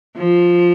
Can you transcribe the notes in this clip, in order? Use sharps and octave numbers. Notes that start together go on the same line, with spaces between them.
F3